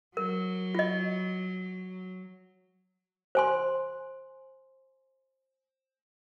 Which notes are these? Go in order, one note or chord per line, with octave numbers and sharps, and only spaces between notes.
F#3 A#4
F4 D#5
C5 G#5 C6